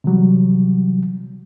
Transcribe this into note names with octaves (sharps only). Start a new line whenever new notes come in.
C3 E3 F#3 G3